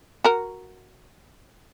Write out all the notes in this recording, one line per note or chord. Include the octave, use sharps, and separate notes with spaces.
F#4 A#4